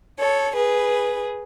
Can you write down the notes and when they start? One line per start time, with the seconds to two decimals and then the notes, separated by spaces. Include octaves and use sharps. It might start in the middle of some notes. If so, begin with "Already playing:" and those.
0.18 A4 C#5
0.55 G#4 B4